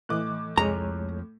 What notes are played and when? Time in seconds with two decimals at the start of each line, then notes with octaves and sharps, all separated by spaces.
0.09 A2 E3 D#5 D6 F#6
0.58 C2 F2 G#3 C#5 A#5